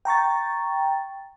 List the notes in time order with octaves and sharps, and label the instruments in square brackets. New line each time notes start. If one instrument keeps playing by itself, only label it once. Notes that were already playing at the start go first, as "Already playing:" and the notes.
[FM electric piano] G5 A#5 C#6 A6